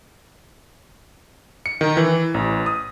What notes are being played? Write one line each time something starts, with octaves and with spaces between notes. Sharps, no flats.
C#7
D#3
E3
A1
D#6